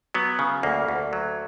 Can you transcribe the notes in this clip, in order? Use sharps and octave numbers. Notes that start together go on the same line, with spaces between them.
F#3 B3
C#3
D2 A#3
D2
F#3